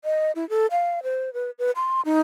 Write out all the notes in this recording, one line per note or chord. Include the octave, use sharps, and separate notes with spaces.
D#5
E4
A4
F5
C5
B4
B4
C6
D#4